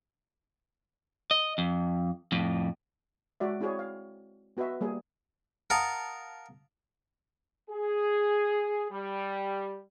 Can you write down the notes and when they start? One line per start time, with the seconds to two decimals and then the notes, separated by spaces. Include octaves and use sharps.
1.31 D#5
1.58 F2
2.32 F2 A2
3.40 G#3 F#4 D5 E5
3.60 C4 E4 F#4 G#4 C#5 D5
3.79 F5
4.57 B3 F#4 B4 D#5 E5
4.81 G3 A#3 G#4
5.70 A#4 F5 F#5 A5 D#6
7.70 G#4
8.92 G3